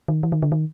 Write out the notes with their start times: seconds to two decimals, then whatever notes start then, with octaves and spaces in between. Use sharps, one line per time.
0.08 D#3
0.23 E3
0.32 D#3
0.42 D3
0.52 D#3